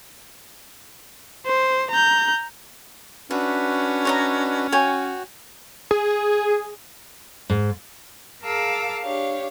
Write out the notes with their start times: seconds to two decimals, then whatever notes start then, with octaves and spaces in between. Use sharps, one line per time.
1.46 C5
1.91 A#5 G6
3.31 C#4 D4 F#4 B4 E5
4.05 C#5 D#5 A#5
4.72 F#4 C#5 G5 G#5
5.91 G#4
7.50 G#2
8.44 G#4 A#4 F5 A5 D6 E6
9.04 D4 G4 C#5 F5